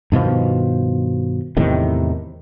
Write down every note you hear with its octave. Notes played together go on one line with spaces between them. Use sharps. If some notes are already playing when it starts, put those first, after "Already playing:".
G2 B2 D#3 F3
E2 A2 C3 D#3